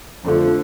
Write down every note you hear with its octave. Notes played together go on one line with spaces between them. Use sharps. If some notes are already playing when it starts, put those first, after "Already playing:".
F2 D3 F3 A3 D4